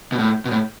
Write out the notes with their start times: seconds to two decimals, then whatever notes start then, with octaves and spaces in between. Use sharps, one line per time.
0.12 B2
0.19 A2
0.45 B2
0.51 A2